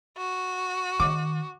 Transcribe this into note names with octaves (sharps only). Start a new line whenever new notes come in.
F#4
D#3 D6